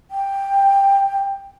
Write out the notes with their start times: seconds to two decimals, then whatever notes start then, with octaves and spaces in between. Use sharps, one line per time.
0.11 G5